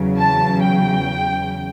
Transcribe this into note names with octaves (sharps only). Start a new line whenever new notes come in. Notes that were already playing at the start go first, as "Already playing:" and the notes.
Already playing: E2 C#3 F#3
A5
G5